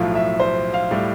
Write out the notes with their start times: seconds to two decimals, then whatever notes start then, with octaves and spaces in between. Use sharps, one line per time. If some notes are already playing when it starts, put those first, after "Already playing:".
Already playing: B1 A2 F3 F5
0.15 E5
0.40 C5
0.74 F5
0.91 A2 G3